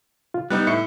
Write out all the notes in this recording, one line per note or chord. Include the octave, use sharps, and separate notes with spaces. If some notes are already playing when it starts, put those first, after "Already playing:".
F4
G3 B3 D#4 F#6
A2 E5 C#7